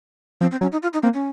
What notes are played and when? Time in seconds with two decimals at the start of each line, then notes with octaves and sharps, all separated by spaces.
0.41 F3 C4
0.51 C4
0.61 F#3 C#4
0.72 D#4
0.83 F4
0.93 D#4
1.03 A#3 C4
1.14 C#4